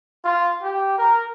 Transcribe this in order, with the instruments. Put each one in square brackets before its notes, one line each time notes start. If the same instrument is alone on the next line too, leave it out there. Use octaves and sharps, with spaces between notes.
[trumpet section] F4
G4
A#4